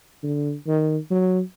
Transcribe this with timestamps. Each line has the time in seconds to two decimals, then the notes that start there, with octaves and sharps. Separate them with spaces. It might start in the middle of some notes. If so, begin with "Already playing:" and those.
0.23 D3
0.67 D#3
1.10 F#3